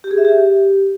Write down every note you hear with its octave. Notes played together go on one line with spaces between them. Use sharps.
G4
G#4
E5
G4